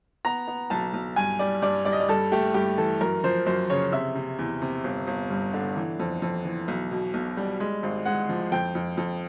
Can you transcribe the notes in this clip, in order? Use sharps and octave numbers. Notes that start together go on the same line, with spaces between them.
B3 A#5
B3
B1 A5
B1
G2 G#5
G3 D5
G2 D5
G3 D5
D#5
D5
G2 A4
A3 G4
G2 G4
E3 A4
F#2 A#4
F3 C5
F#2 C5
C#3 C#5
C3 E5
C3
E2
C3
G1
G1
G2
D3
E3
F2
F2
E3
B1
B2
B1
G3
G#3
G#1
G#3 F#5
F3
F2 G5
F2
F2